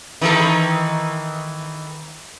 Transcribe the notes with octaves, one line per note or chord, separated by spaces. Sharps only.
D#3 E3 A4